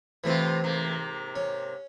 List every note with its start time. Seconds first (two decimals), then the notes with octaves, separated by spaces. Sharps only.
0.24 A2 C3 E3 A3 C4 F4
0.64 G#2 C3 A#3
1.36 C#4